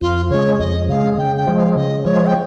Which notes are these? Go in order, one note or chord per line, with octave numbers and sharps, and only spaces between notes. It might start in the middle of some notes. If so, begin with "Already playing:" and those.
F2 F4
C#3 G#3 C#5
F2 D#5
C#3 G#3 F5
C#3 G5
G5
F3 G#3
F5
C#3 D#5
F3 G#3 C#5
G5